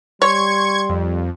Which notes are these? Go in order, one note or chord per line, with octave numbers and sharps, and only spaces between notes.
G3 C#5 C6 C#6 G#6
F2